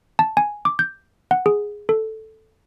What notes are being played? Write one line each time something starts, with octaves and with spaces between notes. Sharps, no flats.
A5
G#5
D6
G6
F#5
G#4
A4